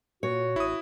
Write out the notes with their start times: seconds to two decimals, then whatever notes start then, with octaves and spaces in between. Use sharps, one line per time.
0.23 A#2 F#4 C#5
0.56 A1 E4 D#6